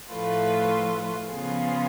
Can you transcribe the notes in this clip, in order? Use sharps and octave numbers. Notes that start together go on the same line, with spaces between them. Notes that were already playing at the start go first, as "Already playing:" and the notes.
A2 F3 A3 F4 B4
C#3 F3 B3 F4 G#4